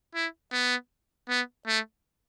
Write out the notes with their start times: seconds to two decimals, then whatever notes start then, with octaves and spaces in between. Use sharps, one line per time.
0.15 E4
0.52 B3
1.29 B3
1.67 A3